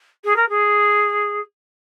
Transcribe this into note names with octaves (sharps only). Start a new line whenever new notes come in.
G#4
A#4
G#4